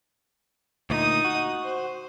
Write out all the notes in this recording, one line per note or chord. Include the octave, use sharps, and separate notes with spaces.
D2 A#2 D#4 D#6
F#4
C5